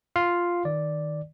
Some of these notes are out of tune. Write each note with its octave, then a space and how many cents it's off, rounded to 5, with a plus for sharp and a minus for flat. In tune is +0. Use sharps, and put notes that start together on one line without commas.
F4 +0 F5 +0
D#3 +0 D5 +0